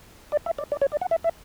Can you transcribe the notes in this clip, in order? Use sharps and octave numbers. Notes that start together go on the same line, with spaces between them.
D5
E5
D5
D5
C#5
D5
F#5
E5
E5